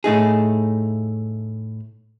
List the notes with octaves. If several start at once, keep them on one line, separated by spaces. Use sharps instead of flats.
A2 A3 D#4 G#4